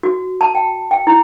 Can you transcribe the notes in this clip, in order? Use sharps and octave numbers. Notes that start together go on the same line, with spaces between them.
F#4
A5
G5
G5
E4